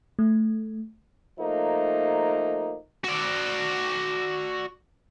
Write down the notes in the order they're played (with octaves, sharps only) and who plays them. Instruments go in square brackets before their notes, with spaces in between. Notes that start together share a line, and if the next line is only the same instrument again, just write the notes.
[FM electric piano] A3
[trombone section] F3 A3 A#3 D#4
[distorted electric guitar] F#4 D5